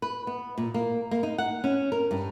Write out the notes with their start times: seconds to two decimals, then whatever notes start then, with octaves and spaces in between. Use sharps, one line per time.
0.02 B4
0.27 B3
0.58 A#2
0.74 A#3
1.11 A#3
1.23 D#4
1.38 F#5
1.64 C#4
1.92 A#4
2.11 G2